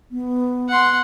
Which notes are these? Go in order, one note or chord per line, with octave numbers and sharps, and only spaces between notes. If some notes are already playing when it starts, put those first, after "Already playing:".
B3
F#5 C6